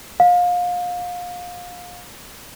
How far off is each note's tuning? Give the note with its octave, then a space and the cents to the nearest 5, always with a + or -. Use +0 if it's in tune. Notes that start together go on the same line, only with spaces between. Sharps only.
F5 +30